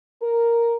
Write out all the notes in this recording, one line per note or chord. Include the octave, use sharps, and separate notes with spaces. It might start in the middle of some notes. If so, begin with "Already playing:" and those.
A#4